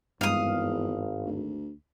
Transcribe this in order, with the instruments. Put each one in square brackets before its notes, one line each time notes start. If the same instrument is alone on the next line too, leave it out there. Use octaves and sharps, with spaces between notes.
[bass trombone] G#1 [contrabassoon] E2 [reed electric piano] G2 G#3 [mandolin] F5 D#6
[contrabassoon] D2